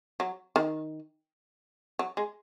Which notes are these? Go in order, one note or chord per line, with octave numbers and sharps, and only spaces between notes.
F#3
D#3
F#3
G#3